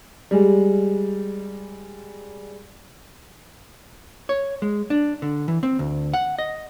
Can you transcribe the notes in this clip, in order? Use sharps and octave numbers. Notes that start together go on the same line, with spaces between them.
G3 G#3
C#5
G#3
D4
D3
E3
C4
D2
F#5
D#5